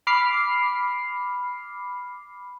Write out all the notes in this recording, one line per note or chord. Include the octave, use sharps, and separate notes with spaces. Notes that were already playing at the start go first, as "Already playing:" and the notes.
B5 D6 F6 C7